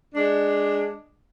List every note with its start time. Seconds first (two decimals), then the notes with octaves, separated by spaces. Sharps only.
0.14 G#3 D4